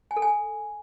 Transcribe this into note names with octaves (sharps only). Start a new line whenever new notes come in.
G#5
A4
G#5